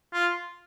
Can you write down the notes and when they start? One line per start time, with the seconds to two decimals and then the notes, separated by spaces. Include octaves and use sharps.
0.13 F4